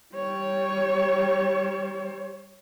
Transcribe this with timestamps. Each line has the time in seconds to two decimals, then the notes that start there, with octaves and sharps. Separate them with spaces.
0.14 G3 C#5